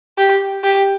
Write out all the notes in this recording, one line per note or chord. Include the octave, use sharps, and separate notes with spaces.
G4
G4